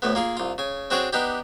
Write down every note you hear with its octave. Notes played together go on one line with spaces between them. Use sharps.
D2 A2 A3 B3
A#3 F4 G#4
C2 F4
C#3 G#5
C4 D4 F#4 G#4 C#5 D5
B3 D4 D#4 G4